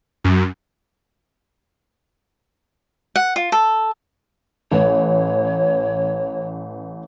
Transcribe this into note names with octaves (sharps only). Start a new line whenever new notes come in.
F#2
F#5
F4
A4
A1 B4 C#5